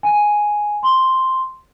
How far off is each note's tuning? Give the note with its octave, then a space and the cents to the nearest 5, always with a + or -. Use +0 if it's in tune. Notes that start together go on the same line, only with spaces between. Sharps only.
G#5 +0
C6 +0